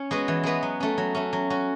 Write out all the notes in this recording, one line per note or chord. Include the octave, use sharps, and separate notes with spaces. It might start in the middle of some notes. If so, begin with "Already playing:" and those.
Already playing: C#4 C#5
G#3 B3 F#4 B4
E3
G#3 B3 F#4 B4
F#3
A3 C#4
F#3
A3 C#4
F#3
C#4 F#4